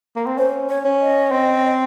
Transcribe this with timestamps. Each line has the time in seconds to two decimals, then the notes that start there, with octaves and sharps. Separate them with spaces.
0.16 A#3
0.27 C4
0.38 C#4 C5
0.69 C#5
0.85 C#4
1.01 D#5
1.32 C4